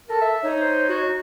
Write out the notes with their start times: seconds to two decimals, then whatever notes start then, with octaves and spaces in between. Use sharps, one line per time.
0.09 A4 A#4
0.22 E5
0.42 D#4 C#5
0.61 C5
0.89 F#4